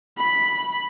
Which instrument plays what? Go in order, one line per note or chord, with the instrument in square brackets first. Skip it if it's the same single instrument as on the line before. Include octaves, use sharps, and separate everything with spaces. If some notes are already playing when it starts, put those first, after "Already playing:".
[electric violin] B5